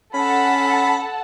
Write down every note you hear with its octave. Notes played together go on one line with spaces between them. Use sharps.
C#4 A4 F#5 A5 B5